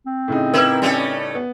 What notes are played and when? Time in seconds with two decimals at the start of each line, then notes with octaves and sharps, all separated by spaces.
0.06 C4
0.28 A2 C#3 D#4
0.54 A#3 E4 A#4 B4
0.82 G3 A3 C#4
1.35 B3